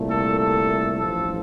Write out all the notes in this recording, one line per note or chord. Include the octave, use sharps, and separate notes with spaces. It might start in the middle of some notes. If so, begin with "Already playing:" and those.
Already playing: C2 A#2 A3
A4
A4
A1 G2 F3 A4